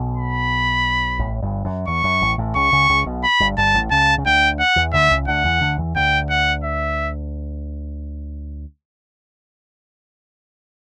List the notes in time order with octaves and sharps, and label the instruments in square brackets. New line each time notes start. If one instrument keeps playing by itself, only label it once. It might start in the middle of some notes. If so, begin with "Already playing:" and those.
Already playing: [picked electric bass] B1 B2
[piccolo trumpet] B5
[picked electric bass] A1 A2
G1 G2
F#2
[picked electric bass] E2 [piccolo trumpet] C#6
[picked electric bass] F#2
A1 A2
A1 A2
[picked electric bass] C#2 C#3 [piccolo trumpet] C#6
[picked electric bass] C#2 C#3
C#2 C#3
B1 B2
[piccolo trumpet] B5
[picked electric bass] G1 G2
[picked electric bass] G1 G2 [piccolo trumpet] A5
[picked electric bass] A1 A2
[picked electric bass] C#2 C#3 [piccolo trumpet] A5
[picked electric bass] C#3
[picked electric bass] D2 D3 [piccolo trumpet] G5
[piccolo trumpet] F#5
[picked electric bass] E2 E3
[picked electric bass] D2 D3 [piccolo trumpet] E5
[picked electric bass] C#2 C#3
[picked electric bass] D2 D3 [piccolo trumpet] F#5
[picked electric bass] E2 E3
D2 D3
E2 E3
[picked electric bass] D2 D3 [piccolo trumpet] G5
[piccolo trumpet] F#5
E5